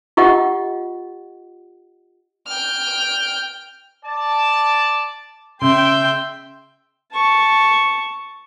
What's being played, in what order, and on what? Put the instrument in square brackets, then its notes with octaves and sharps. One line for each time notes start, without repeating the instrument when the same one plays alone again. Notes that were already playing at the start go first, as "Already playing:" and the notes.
[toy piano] F4 G4 D#5 F#5
[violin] G5 F6
[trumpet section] D5 A5
[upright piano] C#3 [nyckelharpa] E5 C6 [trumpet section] G5
[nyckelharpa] A5 C#6